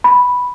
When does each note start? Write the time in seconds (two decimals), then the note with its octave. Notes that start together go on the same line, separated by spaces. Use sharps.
0.04 B5